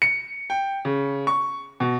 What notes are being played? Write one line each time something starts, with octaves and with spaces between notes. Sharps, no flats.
C#7
G5
C#3
C#6
B2